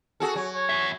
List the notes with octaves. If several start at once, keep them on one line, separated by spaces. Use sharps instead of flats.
F#4 G#4 A4
F#3 C#5
C#5
E2 E5